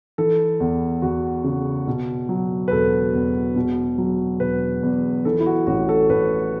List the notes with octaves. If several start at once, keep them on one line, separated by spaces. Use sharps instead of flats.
E3 A4
E2
E2 F#4
C#3
B2
F#3
B4
E1 A4
E2
B2
F#3
E1 B4
E2
E3 A4
E4
F#4
A1 F#4
A4
A1 B4